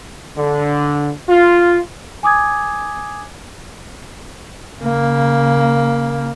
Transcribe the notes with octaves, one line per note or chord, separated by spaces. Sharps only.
D3
F4
G#5 D6 D#6 G#6
C#3 A#3